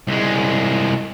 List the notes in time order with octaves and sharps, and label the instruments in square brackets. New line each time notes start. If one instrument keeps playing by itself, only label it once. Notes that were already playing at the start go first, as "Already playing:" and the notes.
[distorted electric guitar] C2 G#3